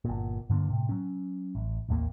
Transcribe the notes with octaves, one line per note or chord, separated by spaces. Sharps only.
G1 A#2
G2 D3 A#3 D4
A2 C3
F#3 C#4
A1
A1 D#2 A3 A#3